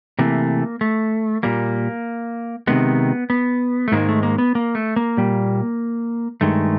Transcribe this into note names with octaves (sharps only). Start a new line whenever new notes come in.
C3 E3 A3 A#3
A3
A#2 G3 A#3
C3 D#3 G#3 B3
B3
A3
G#2 D#3 G#3 A#3
A3
A#3
B3
A#3
A3
A#3
A#2 G3
G2 D#3 G#3 A3